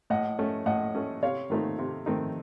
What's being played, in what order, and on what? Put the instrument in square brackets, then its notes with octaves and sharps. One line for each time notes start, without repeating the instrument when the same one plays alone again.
[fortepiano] A2 [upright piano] D#5 F#5
[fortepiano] A3 C#4
[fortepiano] A2 [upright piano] D#5 F#5
[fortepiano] A3 C#4
[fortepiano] C3 [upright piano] C#5 F5
[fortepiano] D#3 A3 C4 D#4
C3
D#3 A3 C4 D#4